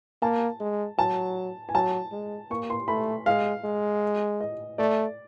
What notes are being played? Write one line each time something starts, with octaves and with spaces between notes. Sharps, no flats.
A#3 A5
G#3
F#3 A5
G#5
F#3 A5
G#3
A#3 C#6
C6
A3 B5
G#3 F5
G#3
D#5
A3 D5